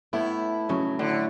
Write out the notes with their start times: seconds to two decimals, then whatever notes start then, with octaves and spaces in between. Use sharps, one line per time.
0.13 A2 A3 B3 E4
0.69 B1 C#3 F#3
0.99 A2 D3 C#5